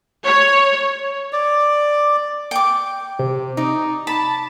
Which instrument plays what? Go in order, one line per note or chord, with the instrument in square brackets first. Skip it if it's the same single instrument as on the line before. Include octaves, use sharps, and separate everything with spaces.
[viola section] C#5
[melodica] D5
[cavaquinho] G5 D6
[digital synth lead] C3
[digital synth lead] D#4 [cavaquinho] D5
[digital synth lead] A5 [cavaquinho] B5